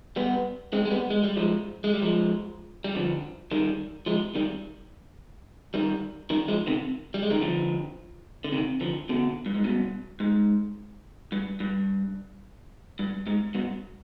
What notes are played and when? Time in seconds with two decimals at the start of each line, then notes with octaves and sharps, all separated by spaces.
0.16 G3 B3
0.73 G#3 C4
0.85 G#3
0.91 G3 B3
1.10 G#3
1.23 G3
1.37 F3 G#3
1.84 G#3
1.93 G3
2.02 F3 G#3
2.84 G3
2.95 D3 F3
3.51 D#3 G3
4.06 F3 G#3
4.35 D#3 G3
5.74 D#3 G3
6.30 D#3 G3
6.48 F3 G#3
6.67 C3 D#3
7.14 G3
7.23 G#3
7.30 D#3 G3
7.41 D3 F3
8.44 D3
8.52 C3 D#3
8.81 D3 F3
9.09 B2 D3
9.46 G2
9.55 G#2
9.64 G2 B2
10.20 G#2
11.32 G2
11.60 G2
12.99 G2
13.27 G#2
13.55 G2 B2